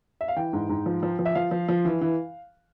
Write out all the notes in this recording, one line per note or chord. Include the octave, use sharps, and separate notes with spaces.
E5
F5
E3 G5
G#2
G#2
F3
F3
F3
E5
F3 F5
F3
F3
E3
E3